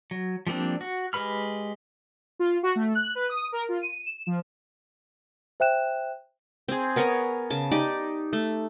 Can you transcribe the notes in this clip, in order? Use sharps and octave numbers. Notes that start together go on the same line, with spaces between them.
F#3
F3 G3 A#3 C4 D4
F#4
G#3 G4 B4 B5 F6
F4
F#4
A3
F#6
B4
D#6
A#4
F4
D#7
E7
F3
C5 E5 G5 F#6 E7
C4 G#4
B3 A#4 C#5 G#5
C#3 A5
D#4 G4 D5
A3